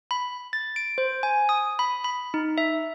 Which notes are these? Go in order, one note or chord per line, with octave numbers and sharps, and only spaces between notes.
B5
A6
D7
C5
G#5
D#6
B5
B5
D#4
E5